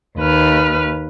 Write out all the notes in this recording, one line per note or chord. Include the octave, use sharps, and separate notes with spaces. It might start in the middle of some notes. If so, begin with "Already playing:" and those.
D#2 B4 F6